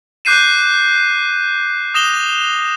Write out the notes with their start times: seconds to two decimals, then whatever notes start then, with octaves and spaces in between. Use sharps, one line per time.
0.25 D6 F#6 G6 C7 D#7 E7
1.94 D#6 A#6 E7 F7 G7